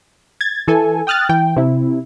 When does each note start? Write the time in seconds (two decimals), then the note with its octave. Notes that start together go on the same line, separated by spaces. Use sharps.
0.41 G#6 A6
0.68 E3 A4 G#5
1.07 G5 D#6 F6 F#6 A6
1.29 E3 G5
1.56 C3 E4